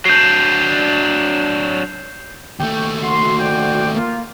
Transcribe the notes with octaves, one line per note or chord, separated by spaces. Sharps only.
F#3 D4 G6 C7
D#2 A3 G5
F#4 C6
C5 D5 G5
A#3 F4